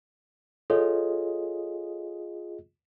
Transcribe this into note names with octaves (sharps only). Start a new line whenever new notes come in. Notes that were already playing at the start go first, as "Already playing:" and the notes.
F4 G#4 A4 C#5 D#5